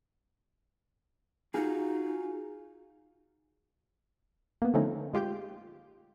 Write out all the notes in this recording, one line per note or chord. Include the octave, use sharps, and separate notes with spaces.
D#4 F4 F#4 G#4
A#3 B3
D3 F3 A3 C4 C#4 D#4
G#3 F4 G4 G5 G6